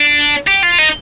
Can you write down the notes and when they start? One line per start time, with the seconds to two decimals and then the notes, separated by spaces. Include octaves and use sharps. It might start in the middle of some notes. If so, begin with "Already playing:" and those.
Already playing: D4
0.47 G4
0.63 F4
0.78 D#4